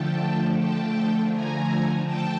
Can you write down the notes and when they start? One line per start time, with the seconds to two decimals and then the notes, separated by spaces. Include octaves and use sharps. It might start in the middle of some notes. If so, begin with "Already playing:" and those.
Already playing: D3 F3 A3 G5 A5
0.59 G5 A5
1.34 G#5 A#5
2.07 G5 A5